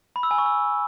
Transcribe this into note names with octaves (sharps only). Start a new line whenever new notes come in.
B5
E6
G#5
C#6
E6